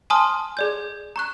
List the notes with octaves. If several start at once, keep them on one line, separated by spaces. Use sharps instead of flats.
G#5 A5 C6 D#6 F6
G#4 D5 G6
A#5 C#6 F#6